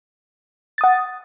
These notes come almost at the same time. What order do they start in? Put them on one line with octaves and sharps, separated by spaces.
A6 D#6 F#5